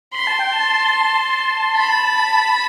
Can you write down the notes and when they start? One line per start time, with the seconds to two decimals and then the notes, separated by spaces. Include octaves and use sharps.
0.14 B5 C6
0.27 A5
0.39 G5
0.52 A5
1.76 B5